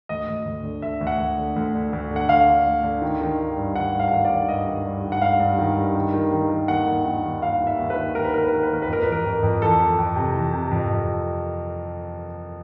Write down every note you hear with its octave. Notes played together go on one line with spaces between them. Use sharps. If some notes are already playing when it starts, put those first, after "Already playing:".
D2 D#5
D2
D2
D3
D3 E5
D2
F#5
D2
D3
D2
D3
D2
D3
F#5
D3 F5
D3
D2
D3
D#3
D#3
D#3
G2
D#3 F#5
G2
F5
F#5
D#3 F5
D5
D#3
G2 D#5
D#3
G2
D#3
F#5
G2 F5
G2
D#3
G2
D#3
D#3
D#3
D#3
D#2 F#5
D#3
D#3
D#2
D#3 F5
D#3
E5
D#2
B4
D#3
D#3 A#4
B4
D#3 A#4
B4
D#3 A#4
B4
D#2 A#4
B4
F2 A#4
E3 B4
A#4
F2
F2
E3 A4
F2
F2
C3
E3
C3
F2
F2